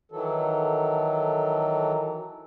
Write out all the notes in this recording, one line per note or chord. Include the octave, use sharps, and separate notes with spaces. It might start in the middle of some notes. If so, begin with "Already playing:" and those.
D#3 E3 F#3 A4